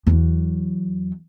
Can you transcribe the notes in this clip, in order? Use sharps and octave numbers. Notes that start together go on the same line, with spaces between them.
E2 F#3